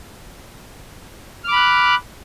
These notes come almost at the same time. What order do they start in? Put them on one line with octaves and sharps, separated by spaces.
F6 D6 B5 F#6